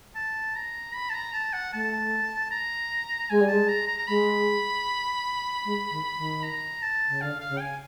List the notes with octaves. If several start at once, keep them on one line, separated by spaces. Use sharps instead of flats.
A5
A#5
B5
A5
A#5
A5
F#5
A3 A5
A#5
G#3 G#5
G3
G#3 A5
A#5
A#5
A#5
G#3 B5
G#3
D#3
D#3
A#5
A5
C#3
D3 F5
F5
C#3
G5
G#5